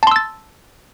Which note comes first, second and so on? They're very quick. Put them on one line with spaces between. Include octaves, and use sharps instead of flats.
A5 C6 E6 A6